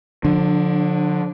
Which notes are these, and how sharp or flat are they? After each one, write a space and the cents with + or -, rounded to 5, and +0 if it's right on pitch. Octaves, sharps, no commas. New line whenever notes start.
D3 +0 F3 +40 D4 +25